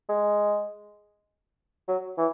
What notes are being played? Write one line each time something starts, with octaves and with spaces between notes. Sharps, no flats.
G#3
F#3
E3